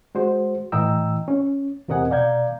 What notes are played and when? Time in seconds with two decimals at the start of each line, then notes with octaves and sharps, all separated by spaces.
0.15 G#3 F#4 C5
0.72 A2 E3 D#5 G5 A#5 E6
1.28 C#4
1.88 E2 C3 A#4 D#5 F#5 G#5
2.10 B2 D5 F5 A#5 G6 G#6